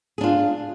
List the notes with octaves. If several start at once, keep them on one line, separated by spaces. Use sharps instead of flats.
D4 F4 G#4